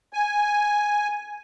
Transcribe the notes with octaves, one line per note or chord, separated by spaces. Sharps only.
G#5